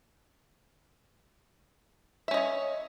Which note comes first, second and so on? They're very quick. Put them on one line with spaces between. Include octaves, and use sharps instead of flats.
E5 C#4 D#5 C#5